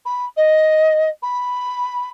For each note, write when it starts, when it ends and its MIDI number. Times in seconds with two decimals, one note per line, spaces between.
0.06 0.26 83
0.37 1.10 75
1.23 2.10 83